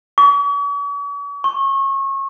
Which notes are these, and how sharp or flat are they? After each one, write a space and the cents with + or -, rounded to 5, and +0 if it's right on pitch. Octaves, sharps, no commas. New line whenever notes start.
C#6 +45
C#6 -30